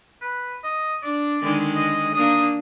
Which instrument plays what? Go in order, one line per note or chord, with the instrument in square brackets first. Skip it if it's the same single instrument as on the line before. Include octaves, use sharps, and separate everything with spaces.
[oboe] B4
D#5
[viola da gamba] D4 [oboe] D5
[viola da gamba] D3 D#3 G#3
[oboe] D#5
[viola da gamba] A#3 D4 [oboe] D#6